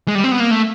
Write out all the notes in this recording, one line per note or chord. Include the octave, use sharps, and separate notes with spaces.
G#3
G3
C4
B3
A#3
A3